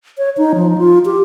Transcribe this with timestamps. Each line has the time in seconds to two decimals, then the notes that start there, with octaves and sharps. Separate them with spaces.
0.18 C#5
0.37 D#4
0.55 F3
0.78 F4
1.05 G4